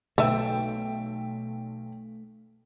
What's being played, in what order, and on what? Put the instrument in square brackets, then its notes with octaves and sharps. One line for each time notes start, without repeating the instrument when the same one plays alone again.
[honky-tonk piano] B1 G5 [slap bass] A3 [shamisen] A4 B4 E5